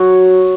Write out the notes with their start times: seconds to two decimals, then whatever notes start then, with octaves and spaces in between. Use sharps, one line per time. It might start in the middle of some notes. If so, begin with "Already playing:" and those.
Already playing: F#3